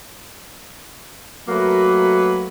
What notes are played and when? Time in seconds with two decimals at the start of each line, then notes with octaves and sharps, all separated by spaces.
1.49 F#3 A3 A#3 F#4 B4